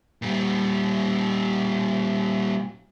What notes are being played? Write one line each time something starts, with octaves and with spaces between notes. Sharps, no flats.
A#2 G3